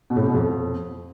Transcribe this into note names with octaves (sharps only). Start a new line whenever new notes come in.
B2
A2
C3
B2
F2